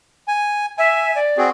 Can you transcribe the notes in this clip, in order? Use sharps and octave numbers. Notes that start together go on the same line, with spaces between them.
G#5
E5 G#5
D5
C4 F#4 G#4